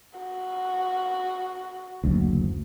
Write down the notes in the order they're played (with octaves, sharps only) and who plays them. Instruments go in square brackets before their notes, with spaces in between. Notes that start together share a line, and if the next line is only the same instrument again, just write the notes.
[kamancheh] F#4
[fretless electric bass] F#1 D2